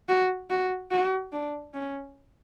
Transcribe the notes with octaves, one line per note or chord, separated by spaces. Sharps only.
F#4
F#4
F#4
D4
C#4